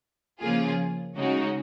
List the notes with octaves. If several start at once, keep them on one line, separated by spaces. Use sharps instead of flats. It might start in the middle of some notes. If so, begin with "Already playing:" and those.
C#3 F3 A#3 F4 G#4
C#3 G#3 D#4 F#4